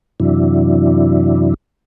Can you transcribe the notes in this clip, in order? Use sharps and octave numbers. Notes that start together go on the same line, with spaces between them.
F#2 C3 E3 F#3 D4 E4